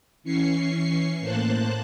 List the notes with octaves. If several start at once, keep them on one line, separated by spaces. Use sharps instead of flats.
E3 C#4 C#6 C7
A2 A#3 C5 A5 F#6